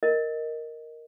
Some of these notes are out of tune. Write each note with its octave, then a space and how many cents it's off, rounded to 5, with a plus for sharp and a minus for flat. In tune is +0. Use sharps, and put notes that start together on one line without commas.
A#4 +0 D#5 +0